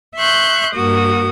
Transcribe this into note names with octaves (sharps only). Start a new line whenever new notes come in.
E5 C6 C#6 F#6 G6
G2 A#3 F#4 D#6